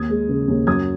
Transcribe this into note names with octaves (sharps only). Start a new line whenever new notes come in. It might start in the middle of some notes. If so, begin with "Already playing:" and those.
Already playing: D#2 D#6 G#6
G#3
C#3
D#2
F#2 D#6 G#6